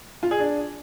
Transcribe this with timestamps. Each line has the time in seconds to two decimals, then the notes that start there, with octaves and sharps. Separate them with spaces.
0.23 F4
0.31 G#4
0.39 D4